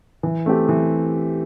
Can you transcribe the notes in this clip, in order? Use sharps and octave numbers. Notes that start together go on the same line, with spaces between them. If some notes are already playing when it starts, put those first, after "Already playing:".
E3
A3 C4 G4
E3